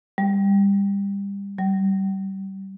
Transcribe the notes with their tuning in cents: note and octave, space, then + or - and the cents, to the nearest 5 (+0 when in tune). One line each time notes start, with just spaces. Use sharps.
G3 +25
G3 -25